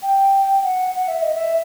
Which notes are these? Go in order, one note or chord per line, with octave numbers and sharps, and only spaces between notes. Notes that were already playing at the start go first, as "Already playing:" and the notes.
G5
F#5
F#5
E5
D#5
E5